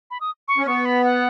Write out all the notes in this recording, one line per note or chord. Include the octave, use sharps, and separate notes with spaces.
B5
D#6
C#6
C#4
B3 C#6
B5
F#5